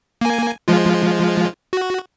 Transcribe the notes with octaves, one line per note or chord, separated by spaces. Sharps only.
A#3 G#5
F3 G#3 F4
F#4